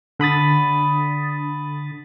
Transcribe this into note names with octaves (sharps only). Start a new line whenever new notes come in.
D3 B5 D#6 A6